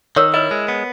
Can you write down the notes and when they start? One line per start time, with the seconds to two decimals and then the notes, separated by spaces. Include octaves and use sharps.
0.16 D#3 A#4 C#5
0.34 E4 B4 D#5
0.51 G#3
0.68 B3